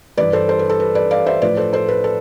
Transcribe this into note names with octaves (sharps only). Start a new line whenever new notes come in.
G2 E3 G3 B4 D5
A4 C5
A4 C5
B4
A4
B4
B4 D5
D5 F5
C5 E5
A2 F3 B4 D5
A4 C5
A4 C5
B4
A4